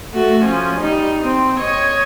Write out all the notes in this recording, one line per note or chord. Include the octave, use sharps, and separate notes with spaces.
A3 F#4
F3 C#4
G3 D#4
C4
C#5 D#5